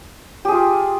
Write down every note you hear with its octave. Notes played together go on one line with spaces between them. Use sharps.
F4 G4 G#4